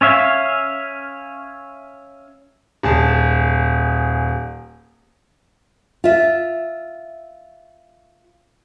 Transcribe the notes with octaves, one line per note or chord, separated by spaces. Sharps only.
C#4 C#5 E5 F5
D#1 G#4 A5
F4 E5